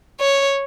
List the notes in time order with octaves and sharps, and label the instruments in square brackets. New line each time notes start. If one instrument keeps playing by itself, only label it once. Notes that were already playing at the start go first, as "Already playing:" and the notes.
[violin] C#5